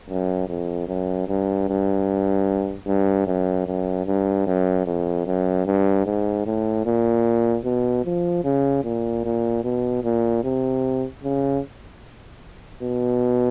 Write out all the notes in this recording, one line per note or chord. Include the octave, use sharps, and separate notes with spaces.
F#2
F2
F#2
G2
G2
G2
F#2
F#2
G2
F#2
F2
F#2
G2
G#2
A2
A#2
B2
F3
C#3
A#2
A#2
B2
A#2
C3
C#3
B2